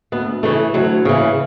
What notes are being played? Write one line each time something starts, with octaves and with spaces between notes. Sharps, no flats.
D2 B3
C#3 E3 A3
D2 F#3
C#3 E3